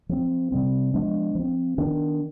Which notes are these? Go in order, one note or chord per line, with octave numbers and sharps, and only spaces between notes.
F3 C4
C3 G3 C4
F3 G#3 B3 D4
F3
C4
D#3 B3 D4